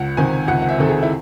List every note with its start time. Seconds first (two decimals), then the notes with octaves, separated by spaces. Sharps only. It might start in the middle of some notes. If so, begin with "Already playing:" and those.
Already playing: C#2 F#5
0.17 C3 D#3 G#5
0.48 C#2 F#5
0.62 F#5
0.69 E5
0.78 C3 D#3 A4
0.89 G#4
1.03 E4